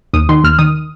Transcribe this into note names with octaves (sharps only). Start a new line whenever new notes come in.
D#2 D#6
D#3 C6
D#2 F6
D#3 D#6